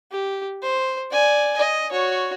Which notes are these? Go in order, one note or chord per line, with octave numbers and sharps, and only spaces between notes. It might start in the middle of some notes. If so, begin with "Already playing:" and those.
G4
C5
D5 G#5
D#5
F#4 C#5